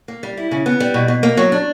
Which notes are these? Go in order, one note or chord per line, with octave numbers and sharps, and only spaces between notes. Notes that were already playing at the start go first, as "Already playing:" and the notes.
A#3
G3
E4
C#3
B3
G3
B2
B2
A#3
F#3
D4